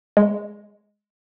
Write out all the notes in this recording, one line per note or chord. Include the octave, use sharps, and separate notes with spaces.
G#3